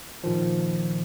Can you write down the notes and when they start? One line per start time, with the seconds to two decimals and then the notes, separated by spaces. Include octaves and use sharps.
0.24 A#2 D#3 F3